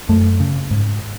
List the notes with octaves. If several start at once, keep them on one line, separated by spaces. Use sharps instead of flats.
F#2 A3
C#3
G#2